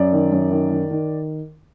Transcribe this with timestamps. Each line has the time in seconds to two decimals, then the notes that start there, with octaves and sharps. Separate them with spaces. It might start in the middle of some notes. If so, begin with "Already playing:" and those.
Already playing: F#2 D5
0.12 D#3
0.32 F#2
0.51 D#3
0.71 D#3
0.91 D#3